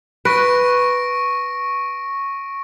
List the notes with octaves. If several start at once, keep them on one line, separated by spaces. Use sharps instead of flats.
B4 C#6 A#6 D7